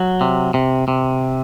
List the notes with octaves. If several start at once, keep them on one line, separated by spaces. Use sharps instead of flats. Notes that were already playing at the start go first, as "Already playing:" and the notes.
Already playing: F#3
C3
C3
C3